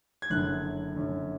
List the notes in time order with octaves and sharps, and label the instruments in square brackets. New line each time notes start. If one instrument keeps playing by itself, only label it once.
[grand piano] G#6
F#1 F#2 D3 F#6
F#1 F#2 D3